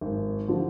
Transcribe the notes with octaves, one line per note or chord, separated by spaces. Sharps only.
G#1
D3 F3